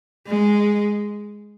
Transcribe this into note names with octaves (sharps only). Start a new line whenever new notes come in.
G#3